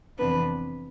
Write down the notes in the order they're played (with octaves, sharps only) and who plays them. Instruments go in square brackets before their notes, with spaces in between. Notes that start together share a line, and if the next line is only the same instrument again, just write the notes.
[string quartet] F2 C3 E3 B3 D4 B4